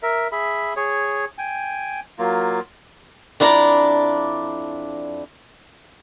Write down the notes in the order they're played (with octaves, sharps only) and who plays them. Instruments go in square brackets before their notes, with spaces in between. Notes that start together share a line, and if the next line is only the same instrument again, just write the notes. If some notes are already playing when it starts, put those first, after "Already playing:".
[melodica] A#4 E5
G#4 E5 B5
G#4 C#5
G5 G#5
F#3 A#3 F4
[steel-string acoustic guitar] F2 D4 E4 D5 A#5